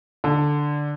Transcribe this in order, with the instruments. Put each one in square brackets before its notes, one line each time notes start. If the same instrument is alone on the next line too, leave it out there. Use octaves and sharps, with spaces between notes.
[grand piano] D3